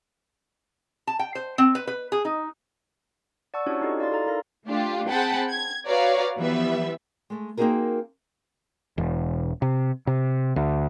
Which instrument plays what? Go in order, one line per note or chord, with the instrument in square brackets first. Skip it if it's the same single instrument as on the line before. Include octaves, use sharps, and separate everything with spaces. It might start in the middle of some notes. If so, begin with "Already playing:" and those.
[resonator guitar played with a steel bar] A5
G5
C5
C4
B4
B4
G#4
D#4
[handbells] D5 F#5 A5 C#6 E6
C#4 D4 E4 F#4 G4 C#5
D#4 E4 F#4 G4 A4 D#5
E4 D5 F5 C6 A6
A4 F5 A#5 A6
D#4 A#4 F5 A#6
[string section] A3 D4 F4 G4
C4 G#4 F#5 G5 A5 B5
G#6
F#4 B4 C#5 D5 F5 A#5
E3 F3 G3 B3 B4 E5
[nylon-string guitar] G#3 A3
A#3 C4 D#4 F#4 G#4 A#4
[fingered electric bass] E1
C3
C3
D2